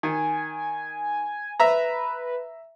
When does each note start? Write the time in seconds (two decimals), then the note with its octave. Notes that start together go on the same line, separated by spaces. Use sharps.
0.03 D#3 G#5
1.60 B4 E5 A#5